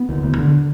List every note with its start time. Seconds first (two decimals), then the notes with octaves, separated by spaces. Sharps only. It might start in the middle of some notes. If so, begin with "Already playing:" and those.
Already playing: B3
0.09 D2
0.23 D2
0.38 D3